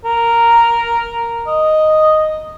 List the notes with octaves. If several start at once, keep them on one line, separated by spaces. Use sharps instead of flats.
A#4
D#5